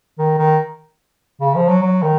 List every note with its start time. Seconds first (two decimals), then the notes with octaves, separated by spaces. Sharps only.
0.19 D#3
0.39 D#3
1.41 C#3
1.55 F3
1.68 F#3
1.82 F#3
2.02 D#3